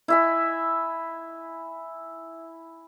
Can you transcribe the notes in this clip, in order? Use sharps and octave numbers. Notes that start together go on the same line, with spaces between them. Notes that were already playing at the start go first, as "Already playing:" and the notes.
E4 E5 G#5